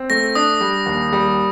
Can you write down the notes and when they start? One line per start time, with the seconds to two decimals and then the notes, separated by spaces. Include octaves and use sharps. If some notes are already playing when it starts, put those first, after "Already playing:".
Already playing: C4
0.10 A3 A#6
0.35 D4 D#6
0.61 G3
0.86 D#2
1.13 G3